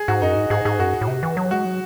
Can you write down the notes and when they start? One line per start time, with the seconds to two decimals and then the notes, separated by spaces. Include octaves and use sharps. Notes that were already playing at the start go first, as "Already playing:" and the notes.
Already playing: G#4
0.08 G#2 F#4
0.22 F#2 D#4
0.36 G#2
0.50 G#2 G#4
0.65 G#2 G#4
0.79 F#2 F#4
1.01 A2
1.08 C3
1.23 E3
1.37 F#3
1.51 G#3 F#4
1.65 F#3